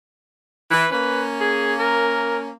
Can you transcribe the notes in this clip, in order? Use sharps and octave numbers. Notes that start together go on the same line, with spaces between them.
E3 B4
A#3 C#4 B4
G#4
A#4